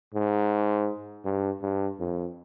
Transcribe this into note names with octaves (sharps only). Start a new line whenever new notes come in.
G#2
G2
G2
F2